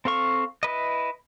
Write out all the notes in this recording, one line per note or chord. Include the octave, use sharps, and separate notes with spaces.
C4 A4 F5 C#6
E4 B4 D#5